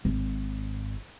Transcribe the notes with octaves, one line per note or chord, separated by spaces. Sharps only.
G#1